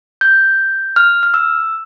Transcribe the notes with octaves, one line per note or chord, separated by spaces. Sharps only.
G6
F6
F6
E6